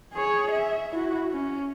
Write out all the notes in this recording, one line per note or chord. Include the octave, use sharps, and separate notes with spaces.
G#4 C#5
E5
E4 F#4
C#4